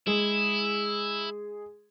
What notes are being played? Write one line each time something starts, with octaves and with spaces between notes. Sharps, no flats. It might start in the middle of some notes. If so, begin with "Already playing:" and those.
G#3 E4 G#4